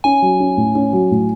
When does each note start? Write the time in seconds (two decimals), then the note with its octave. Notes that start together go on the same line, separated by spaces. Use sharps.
0.04 C#4 G#5
0.22 F#3
0.40 C#4
0.57 A2
0.75 C#4
0.93 F#3
1.11 A2